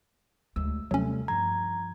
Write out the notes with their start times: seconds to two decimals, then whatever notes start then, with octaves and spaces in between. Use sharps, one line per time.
0.56 D2 G#3 E6
0.91 D#2 C3 F#3 G3 A3 C#4
1.28 G2 F3 A#5 G#6